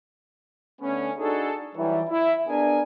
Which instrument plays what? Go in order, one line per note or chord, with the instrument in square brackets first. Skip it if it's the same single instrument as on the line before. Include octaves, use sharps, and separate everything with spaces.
[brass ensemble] D3 A3 B3 C#4
D4 D#4 F#4 G#4 A4
E3 F#3 G3
E4
B3 D4 G#4 A#4 G#5